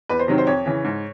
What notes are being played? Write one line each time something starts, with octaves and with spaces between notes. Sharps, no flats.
E2 B4
C5
C3 D#3 F#3
C5
F2 C#5
C#3 E3
G#2